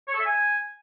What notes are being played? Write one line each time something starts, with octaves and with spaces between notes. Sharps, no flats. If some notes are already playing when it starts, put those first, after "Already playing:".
C#5
A4
E5
G#5